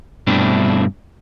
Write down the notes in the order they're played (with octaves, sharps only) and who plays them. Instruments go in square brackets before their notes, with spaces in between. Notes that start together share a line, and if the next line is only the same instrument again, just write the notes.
[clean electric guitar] G2 B2 A3 C4 D4 E4